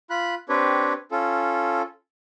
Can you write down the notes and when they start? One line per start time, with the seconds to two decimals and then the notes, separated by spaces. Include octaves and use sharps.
0.10 F4 B5 F#6
0.49 C4 D4 G4 B4 C#5
1.11 C#4 F4 A4